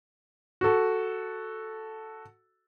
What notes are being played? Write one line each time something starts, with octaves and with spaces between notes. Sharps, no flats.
F#4 A4